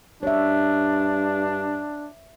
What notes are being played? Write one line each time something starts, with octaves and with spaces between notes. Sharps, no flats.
G2 D4 C#5 E5